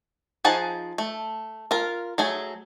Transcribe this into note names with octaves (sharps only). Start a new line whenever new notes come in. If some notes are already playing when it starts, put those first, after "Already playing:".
F3 D#4 G#4 F#5 A5
A3
F4 A#4
F#3 A3 G#4